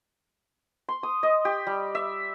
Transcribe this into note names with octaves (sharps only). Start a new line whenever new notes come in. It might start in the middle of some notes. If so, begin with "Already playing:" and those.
C6
D#6
D#5
G4
G3
E5